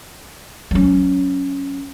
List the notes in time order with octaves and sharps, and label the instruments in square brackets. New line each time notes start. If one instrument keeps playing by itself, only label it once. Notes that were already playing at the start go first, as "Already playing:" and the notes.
[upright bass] F#3 C#4